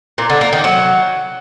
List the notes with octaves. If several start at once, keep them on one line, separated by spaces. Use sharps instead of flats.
A#2
D3
A#3
D#3
F#3